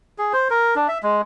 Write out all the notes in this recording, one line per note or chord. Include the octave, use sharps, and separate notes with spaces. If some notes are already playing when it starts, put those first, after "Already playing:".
G#4
C5
A#4
D4
E5
G#3